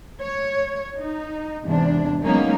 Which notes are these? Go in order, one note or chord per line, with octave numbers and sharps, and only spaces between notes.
C#5
D#4
E2 G#2 C3 D4
F#3 G#3 A#3 B3 C#4 D#4